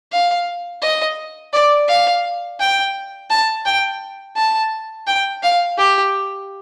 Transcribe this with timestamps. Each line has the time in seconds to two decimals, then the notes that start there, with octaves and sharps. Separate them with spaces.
0.12 F5
0.82 D#5
1.53 D5
1.88 F5
2.60 G5
3.30 A5
3.66 G5
4.36 A5
5.07 G5
5.43 F5
5.78 G4